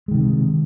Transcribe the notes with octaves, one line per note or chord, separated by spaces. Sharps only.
C3 D#3 G#3